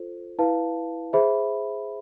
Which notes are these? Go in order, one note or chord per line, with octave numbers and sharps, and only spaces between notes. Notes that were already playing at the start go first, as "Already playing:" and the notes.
Already playing: F4 A4 C5
E4 B4 F5 A5
G#4 C5 E5 B5